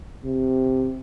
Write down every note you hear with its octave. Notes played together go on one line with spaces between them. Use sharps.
C3